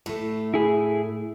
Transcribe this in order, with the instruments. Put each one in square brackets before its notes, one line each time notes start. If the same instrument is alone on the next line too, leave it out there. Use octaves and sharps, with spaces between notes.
[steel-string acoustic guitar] A2 A3
[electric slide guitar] E4 G#4